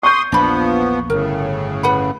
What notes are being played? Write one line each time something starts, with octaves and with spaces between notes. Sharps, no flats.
C6 C#6 D#6 G6
A#1 E2 A#2 F3 B3 D4 B5
G1 A2 C#3 A#4
B4 F#5 B5